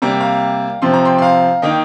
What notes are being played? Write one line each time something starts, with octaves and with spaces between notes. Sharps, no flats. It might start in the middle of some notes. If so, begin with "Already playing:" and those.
C3 G3 A#3 A#5
G5
F5 A#5
C3 F3 C4 C6
A#5
G5 C6
C6
F5 A#5
D#3 A#3 D#4 D#5 G5